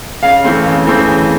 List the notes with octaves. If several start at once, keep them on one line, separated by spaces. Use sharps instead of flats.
C#3 F5
E3 A3 C4
C#3
E3 A3 C4
C#3